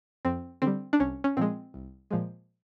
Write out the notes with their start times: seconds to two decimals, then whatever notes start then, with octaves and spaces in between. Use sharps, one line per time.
0.25 F2 C4
0.62 D3 G3 C4
0.93 D4
0.99 C2 C#4
1.24 C#4
1.37 A#2 F3 G#3 C4
1.74 C2
2.11 A#2 F3 G#3